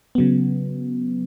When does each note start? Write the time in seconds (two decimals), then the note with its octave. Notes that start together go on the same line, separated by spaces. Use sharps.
0.15 C#3 F#3 B3